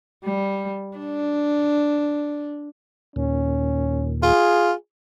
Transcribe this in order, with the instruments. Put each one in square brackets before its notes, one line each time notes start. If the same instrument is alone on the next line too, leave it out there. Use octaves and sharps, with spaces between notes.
[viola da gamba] G3
D4
[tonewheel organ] D#2 A#2 [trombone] C#4
[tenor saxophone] F4 [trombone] G#4